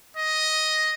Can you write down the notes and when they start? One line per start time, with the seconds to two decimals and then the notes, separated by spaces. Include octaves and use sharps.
0.17 D#5